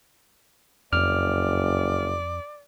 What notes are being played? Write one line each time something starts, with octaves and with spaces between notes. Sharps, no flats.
F#1 F2 D5 F6